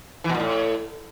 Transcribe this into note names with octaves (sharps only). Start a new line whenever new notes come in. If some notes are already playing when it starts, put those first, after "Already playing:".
E3
B2
A#2
A2